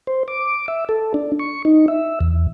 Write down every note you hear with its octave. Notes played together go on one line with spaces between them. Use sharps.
C5
D6
E5
A4
D4
C#6
D#4
E5
E2